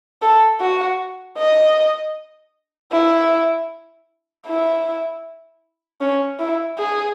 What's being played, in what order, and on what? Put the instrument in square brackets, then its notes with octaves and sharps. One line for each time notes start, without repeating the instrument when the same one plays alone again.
[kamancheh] A4
F#4
D#5
E4
E4
C#4
E4
G#4